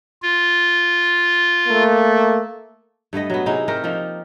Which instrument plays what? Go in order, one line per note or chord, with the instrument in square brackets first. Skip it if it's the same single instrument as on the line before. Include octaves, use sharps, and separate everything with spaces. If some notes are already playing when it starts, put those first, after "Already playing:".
[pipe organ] F4
[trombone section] A3 A#3
[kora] G2 A3 B3 D#5
F#3 B3
C3 D#4 E4 G#4
A3 G4 A#4
F3 A#3 D#4